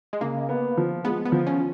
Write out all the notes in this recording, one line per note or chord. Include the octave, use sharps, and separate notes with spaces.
G#3
C#3 A#3
B3
F3
G#3 B3
B3
F3
C#4